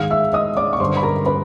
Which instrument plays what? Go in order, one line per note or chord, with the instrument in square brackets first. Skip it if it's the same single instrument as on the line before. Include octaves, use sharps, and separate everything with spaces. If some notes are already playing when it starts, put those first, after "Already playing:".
Already playing: [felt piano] G#2 D#3 F5 F6
E5 E6
D#5 D#6
D5 D6
C#6
G2 D3 C5 C6
B5
A#4 A#5
B4 B5